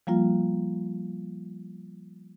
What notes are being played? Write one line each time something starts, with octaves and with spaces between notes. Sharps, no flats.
F3 G3 A#3 F4